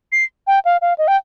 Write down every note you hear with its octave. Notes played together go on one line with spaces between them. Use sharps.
C7
G5
F5
F5
D#5
G5